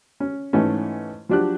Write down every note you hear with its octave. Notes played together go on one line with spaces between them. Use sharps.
C#4
G#2 E3 A3 C#4
F3 F#3 D4 G4 F#6